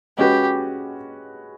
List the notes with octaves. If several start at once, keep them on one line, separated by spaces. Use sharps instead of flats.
G#3 C#4 F#4 G4 B4